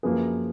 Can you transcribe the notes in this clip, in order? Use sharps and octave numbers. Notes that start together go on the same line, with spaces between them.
F#2 F3 A#3 G#4 B4